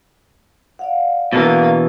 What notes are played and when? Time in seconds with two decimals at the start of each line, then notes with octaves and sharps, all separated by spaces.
0.79 D5 F5 F#5
1.33 B2 E3 A#3